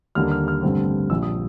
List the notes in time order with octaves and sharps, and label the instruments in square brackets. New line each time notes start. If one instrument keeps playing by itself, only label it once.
[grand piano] D#2 D3 G3 A#3 F6
F6
F6
A1 G2 D3 G3 C4
A#1 A#2 G3 E6
D#6